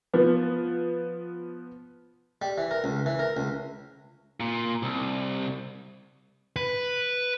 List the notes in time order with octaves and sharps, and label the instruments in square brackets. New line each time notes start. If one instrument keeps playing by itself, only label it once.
[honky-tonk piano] F3 B3
[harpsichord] G3
E3
A#4
C#2
E3
A#4
C#2
[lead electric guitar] A#2
C2
[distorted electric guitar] B4